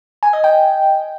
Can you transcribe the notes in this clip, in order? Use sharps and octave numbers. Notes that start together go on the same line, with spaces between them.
G#5
D#5
G5